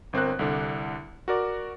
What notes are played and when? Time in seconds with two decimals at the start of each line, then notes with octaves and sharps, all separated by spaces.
0.13 G1 C4 A#4 F#6
0.39 C2 D3 D4
1.28 F#4 A#4 D5